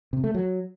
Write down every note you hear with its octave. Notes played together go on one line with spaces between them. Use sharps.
C3
A3
F#3